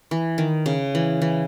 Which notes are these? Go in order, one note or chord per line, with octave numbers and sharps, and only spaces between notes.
E3
D#3
C#3
E3
E3